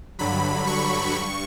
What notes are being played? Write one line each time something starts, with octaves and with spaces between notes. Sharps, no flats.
G2 D3 F#3 B5
C#6
G2 C#6